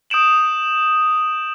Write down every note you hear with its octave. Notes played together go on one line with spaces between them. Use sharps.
D#6 G6 D7 E7 F#7